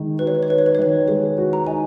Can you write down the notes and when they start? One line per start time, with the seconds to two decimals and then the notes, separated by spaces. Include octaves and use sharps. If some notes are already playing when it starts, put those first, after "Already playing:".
Already playing: D#3 G#3 D#4
0.19 F#4 B4
0.27 C#5
0.35 B4
0.43 C#5
0.49 D#4 B4
0.58 C#5
0.66 B4
0.75 C#5
0.79 D#3 B4
1.08 G#3 C#5
1.38 F#4
1.53 A#5
1.67 D#4 G#5